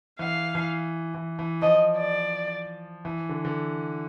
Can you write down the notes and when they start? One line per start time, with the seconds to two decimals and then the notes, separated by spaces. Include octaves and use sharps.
0.19 E3 F5
0.55 E3
1.14 E3
1.39 E3
1.62 F3 D#5
1.97 D5
3.05 E3
3.29 D3
3.45 D3